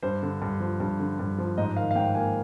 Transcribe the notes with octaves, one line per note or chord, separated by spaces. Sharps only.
G2 C5
D3
G2
F3
G2
D3
G2
F3
G#2 D#5
D#3 F5
F5
G#2 G5
A#3 G#5